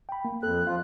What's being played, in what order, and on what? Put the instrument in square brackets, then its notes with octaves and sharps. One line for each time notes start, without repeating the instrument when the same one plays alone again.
[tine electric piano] G5 B5
A#3
[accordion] F2 F#6 [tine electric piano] A4
[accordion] F3 F4 F#6 [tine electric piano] F5